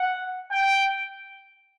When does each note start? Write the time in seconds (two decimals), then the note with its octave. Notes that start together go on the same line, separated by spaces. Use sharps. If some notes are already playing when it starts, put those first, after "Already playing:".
Already playing: F#5
0.51 G5